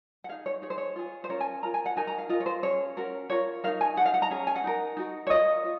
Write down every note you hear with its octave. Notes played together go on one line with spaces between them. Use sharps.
F#5
D#4 G#4 F5
C#5
D#4 G#4 C#5
C5
C#5
F4 G#4
C5
C#4 F4 A#4 C#5
G#5
F4 A#4 A#5
G#5
F#5
D#4 F#4 A#4 G#5
A#5
F5
F4 A#4 D#5
C#5
C5
C#4 G#4 C#5
C#4 F#4 A#4
F4 A#4 C#5
D#4 F#4 A#4 F5
G#5
G#4 F#5
D#4 F5
F#5
A#5
C#4 G#4
G#5
F#5
D#4 A#4
D#4 F#4 A#4
C#5
F4 A#4 D#5
F4